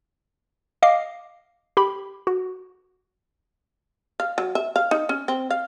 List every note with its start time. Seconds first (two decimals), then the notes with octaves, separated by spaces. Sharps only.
0.83 D#5 F5 D6 C7
1.77 G4 B5
2.27 F#4
4.20 F5
4.38 F#3
4.55 E5
4.76 F5
4.91 D#4
5.09 C#4
5.28 C4
5.50 F5